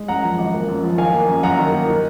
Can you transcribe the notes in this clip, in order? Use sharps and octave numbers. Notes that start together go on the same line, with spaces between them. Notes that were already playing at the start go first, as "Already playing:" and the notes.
Already playing: G#3
F#2 F#5 A#5
F3
G#1
A#3
F#2
F3
D#3 F5 G#5
A#3
F#2
F#2 F#5 A#5
D#3
A#3
D#3